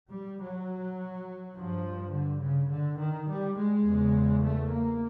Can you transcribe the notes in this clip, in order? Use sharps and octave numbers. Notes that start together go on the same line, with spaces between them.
G3
F#3
G2 F3
D3
C#3
D3
D#3
G3
G#3
E2 C#3
A3
A#3